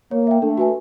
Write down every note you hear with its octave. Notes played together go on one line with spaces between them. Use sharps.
A#3 C#5
E5 G5
A3 D4
F#4 B4 E5 G#5